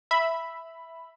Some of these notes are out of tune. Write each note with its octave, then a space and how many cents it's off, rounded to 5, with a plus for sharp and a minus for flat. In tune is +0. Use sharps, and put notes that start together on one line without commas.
E5 +0 B5 +0